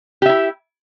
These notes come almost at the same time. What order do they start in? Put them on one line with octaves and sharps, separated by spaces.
G4 E5 E4